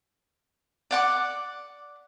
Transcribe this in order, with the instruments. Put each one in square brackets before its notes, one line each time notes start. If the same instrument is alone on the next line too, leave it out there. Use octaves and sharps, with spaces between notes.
[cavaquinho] D5 F#5 D6